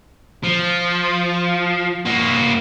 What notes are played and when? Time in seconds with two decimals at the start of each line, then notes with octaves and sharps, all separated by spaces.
0.43 F3
2.05 A#3 F#4